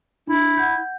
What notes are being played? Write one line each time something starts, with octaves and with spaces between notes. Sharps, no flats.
D4 E4
F#5 G6